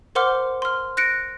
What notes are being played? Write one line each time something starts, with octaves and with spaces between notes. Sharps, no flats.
A#4 C5 F#5 C6 D6 F6
C6 F6
F#6 A#6 C#7 D7